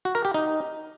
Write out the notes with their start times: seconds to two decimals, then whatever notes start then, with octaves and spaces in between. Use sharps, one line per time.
0.05 F#4
0.15 A#4
0.25 G4
0.34 D#4